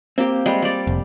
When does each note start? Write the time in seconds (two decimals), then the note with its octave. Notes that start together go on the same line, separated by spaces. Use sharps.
0.18 A#3 C4 G4
0.46 G3 G#3
0.62 G3 D5
0.87 F1